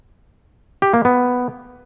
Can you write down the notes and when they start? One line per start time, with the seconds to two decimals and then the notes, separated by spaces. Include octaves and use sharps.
0.82 G4
0.94 A#3
1.05 B3